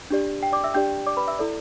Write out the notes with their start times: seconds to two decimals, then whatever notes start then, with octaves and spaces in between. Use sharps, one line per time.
0.10 D4 G4 D5
0.43 G5
0.52 D5 D6
0.64 E5 E6
0.74 D4 G4 D5 G5 G6
1.07 D5 D6
1.17 B4 B5
1.28 E5 E6
1.39 E4 A4 D5